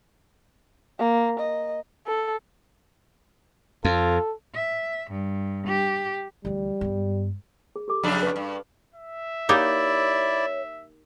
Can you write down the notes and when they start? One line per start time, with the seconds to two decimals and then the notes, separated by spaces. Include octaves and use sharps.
0.99 A#3
1.40 D#5
2.07 A4
3.85 F2 F4 A4
4.56 E5
5.10 G2
5.68 G4
6.45 D2 E3 G3
6.81 G2 B3
7.76 G#4
7.88 G4 A4 D6
8.03 F2 C#3 D4 A5 B5 D#6
8.23 B4 C#6
8.36 G2
8.95 E5
9.49 A#3 D#4 E4 G4 C#5 D5